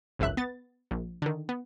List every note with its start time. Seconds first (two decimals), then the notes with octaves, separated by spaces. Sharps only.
0.19 G#1 C#2 F#2 E5 F#6
0.37 B3 A6
0.91 A#1
1.22 D3 D#3
1.49 B3